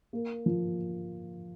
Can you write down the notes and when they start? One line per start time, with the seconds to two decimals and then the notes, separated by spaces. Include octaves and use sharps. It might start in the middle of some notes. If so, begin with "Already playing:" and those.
0.13 A#3
0.46 F3